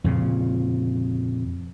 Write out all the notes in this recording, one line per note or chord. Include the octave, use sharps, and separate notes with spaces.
F2 A#2 C#3